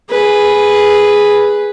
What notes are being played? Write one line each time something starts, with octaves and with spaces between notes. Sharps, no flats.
G#4 B4